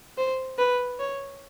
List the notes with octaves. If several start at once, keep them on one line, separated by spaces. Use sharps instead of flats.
C5
B4
C#5